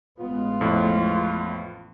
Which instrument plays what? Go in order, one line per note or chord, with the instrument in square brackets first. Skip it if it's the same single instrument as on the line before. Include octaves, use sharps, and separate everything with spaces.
[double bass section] A1 G#3 B3 [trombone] F4
[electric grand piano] F2 A2